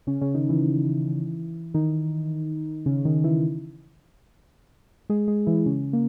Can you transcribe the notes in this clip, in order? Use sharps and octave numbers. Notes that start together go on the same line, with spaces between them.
C#3 C#4
C#3 C#4
D#3 D#4
E3 E4
D#3 D#4
C#3 C#4
D#3 D#4
E3 E4
G#3 G#4
G#3 G#4
E3 E4
C#3 C#4
A#3